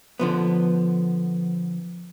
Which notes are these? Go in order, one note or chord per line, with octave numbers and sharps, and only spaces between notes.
D3 F3 B3